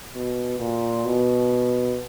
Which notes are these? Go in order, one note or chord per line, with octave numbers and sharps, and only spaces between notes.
B2
A#2
B2